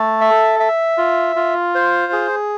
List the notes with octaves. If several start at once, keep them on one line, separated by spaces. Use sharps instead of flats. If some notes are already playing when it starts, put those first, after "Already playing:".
Already playing: A3 A4
E5
E5
F4
F4
C5
G#4